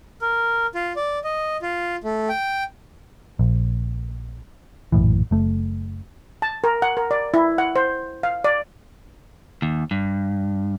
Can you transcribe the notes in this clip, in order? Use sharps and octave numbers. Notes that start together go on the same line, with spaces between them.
A#4
F4
D5
D#5
F4
A3
G5
A#1
A#1 F#2 A2 E3
F#1 A3
A5
A#4
F#5
A#4
D5
E4
F#5
C5
F5
D5
D#2
G2